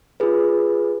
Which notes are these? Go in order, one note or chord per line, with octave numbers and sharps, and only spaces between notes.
F4 G#4 B4